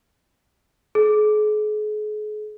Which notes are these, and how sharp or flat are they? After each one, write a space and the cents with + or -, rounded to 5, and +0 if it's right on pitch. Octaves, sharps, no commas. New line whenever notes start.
G#4 +40